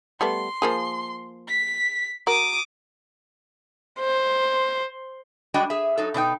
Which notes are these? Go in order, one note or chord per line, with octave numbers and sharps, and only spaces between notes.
G3 A3 B3 C6
F3 A#3 G#4
B6
F#4 A#4 D6 D#6
C5
G3 G#3 D4 F#4 D#5 G5
G#4 E5
F#3 D#4 A4
B2 D4 D#4 G5